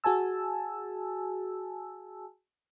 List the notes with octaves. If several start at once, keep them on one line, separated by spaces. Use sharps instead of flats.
F#4 G#4 G#5 A5 E6